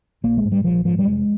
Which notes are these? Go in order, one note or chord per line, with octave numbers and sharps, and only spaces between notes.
A#1 A#3
G#3
G#2
G3
A#1 F3
G#2 F3
G3
F1 G#3